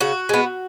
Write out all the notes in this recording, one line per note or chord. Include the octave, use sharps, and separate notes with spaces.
C#3 F#4
G#3 B3